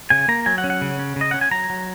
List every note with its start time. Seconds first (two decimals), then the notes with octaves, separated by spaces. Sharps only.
0.10 C#3 G#5
0.28 A#3 A#5
0.46 F#3 G#5
0.58 F#5
0.64 C#4
0.70 F#5
0.82 C#3
0.99 C#4
1.16 C#3 D#5
1.31 C#4 F#5
1.41 G#5
1.51 F#3 A#5
1.70 F#3